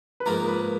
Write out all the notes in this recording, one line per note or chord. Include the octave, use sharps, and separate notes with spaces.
B4
G#2 F3 A#3 A#4
B4